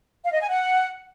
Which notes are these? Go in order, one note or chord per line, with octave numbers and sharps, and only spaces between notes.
F5
D#5
G#5
F#5